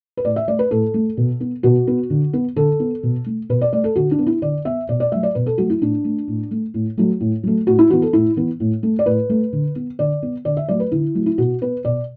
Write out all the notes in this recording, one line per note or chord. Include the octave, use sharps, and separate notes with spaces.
B4
A2 D5
E5
A3 D5
B4
A2 A4
A3
B2
B3
B2 F#4
B3
D3
B3
D3 A4
B3
B2
A3
B2 B4
D5
A3 D5
A4
D3 F#4
D4
B3
E4
D3 D5
B3 E5
B2 D5
D5
F#3 A3 E5
D5
B2 B4
A4
F#3 A3 F#4
E4
A2 D4
A3
A2
A3
A2
F#3 A3
A2
F#3 A3
A2 F#4
E4
E3 B3 F#4
A4
A2 E4
E3 B3
A2
A3
D5
A2 B4
A3
D3
B3
D3 D5
B3
D3 D5
E5
F#3 A3 D5
B4
D3 E4
F#3 A3
E4
B2 F#4
B3 B4
B2 D5